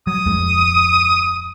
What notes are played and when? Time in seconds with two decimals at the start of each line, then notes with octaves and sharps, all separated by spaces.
0.07 F#3 D#6
0.26 D1 F2 G#3